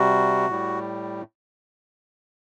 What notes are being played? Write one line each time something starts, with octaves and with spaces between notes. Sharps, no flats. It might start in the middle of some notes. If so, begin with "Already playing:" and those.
Already playing: C3 G3 F#4
A2 G3